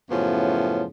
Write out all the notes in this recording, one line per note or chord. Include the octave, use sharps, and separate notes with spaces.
F#2 A2 C#3 F3 B3 C#4